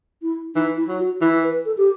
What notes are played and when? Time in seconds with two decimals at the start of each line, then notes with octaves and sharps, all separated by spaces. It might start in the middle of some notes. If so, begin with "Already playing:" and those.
0.22 E4
0.55 E3 D#4
0.77 E4
0.88 F#3
1.00 F#4
1.21 E3 E4
1.43 B4
1.66 A4
1.77 G4